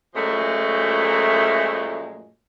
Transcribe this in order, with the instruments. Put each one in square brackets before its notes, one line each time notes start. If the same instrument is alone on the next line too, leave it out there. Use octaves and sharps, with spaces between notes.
[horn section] F#2 A#2 F3 G#3 A3